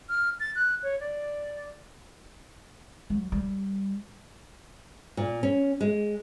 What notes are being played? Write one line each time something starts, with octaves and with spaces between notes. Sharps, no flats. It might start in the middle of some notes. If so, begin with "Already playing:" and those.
F6
A6
F#6
C#5
D5
F#3
G3
A#2
C#4
G#3